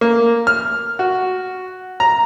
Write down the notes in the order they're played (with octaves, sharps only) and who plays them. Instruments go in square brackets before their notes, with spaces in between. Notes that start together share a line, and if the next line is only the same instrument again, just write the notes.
[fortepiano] A#3
F6
F#4
A#5